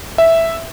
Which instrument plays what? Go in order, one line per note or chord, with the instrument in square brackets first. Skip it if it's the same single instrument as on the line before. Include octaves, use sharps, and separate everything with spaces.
[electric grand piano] E5